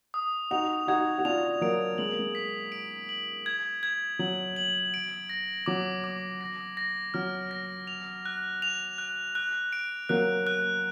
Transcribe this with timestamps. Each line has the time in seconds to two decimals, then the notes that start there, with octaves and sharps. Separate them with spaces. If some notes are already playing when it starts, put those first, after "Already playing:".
0.14 D#6
0.51 D#4 F#4 F7
0.88 D#4 F#4 G#6
1.19 F#4
1.25 D4 F4 F7
1.61 F#3 A#3 D7
1.98 G#3 F#7
2.09 A#3
2.19 G#3
2.35 B6
2.72 D7
3.09 F#7
3.46 G#6
3.83 G#6
4.19 F#3 F#7
4.56 F#7
4.94 D7
5.30 A#6
5.66 F#3 D6
6.04 D6
6.41 A#6
6.77 A#6
7.14 F#3 F6
7.51 A#6
7.87 F7
8.25 F#6
8.62 F7
8.98 F#6
9.35 F#6
9.73 D7
10.09 F#3 A#3 F#6
10.47 F#6